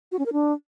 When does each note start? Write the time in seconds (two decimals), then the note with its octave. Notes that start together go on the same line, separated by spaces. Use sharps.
0.12 F#4
0.19 C#4
0.26 A#4
0.33 D4